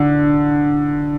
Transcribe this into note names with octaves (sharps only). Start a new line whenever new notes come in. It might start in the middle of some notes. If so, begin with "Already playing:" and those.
Already playing: D3